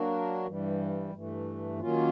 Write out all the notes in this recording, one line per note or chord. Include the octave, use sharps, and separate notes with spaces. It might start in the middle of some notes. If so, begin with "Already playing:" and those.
Already playing: F#3 A#3 D4 F#4 A#4
G2 E3 G3
G2 E3 A3
D#3 F#3 A#3 C#4 F4